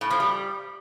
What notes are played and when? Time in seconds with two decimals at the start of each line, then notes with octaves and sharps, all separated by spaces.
0.01 A2
0.11 F3
0.20 G3